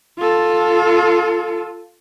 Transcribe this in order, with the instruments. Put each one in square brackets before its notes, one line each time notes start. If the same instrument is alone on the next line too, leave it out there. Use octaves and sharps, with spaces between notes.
[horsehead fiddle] F4 A4